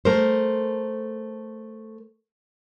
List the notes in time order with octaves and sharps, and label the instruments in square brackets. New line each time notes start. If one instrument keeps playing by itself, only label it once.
[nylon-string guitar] A3 A#4 C5